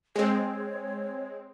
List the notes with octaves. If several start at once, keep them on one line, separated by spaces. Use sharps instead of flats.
G#3 C4 C#5